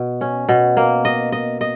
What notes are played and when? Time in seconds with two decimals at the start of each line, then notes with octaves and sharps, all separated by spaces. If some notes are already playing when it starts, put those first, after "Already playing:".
Already playing: B2
0.21 C#4
0.49 B2
0.77 A#3
1.05 D#5
1.32 D#5
1.61 D#5